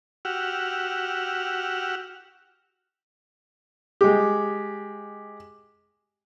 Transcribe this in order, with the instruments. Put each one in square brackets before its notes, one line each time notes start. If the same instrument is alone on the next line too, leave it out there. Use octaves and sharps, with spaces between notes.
[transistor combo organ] F#4 G4 F#5 E6 F6
[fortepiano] G#3 G4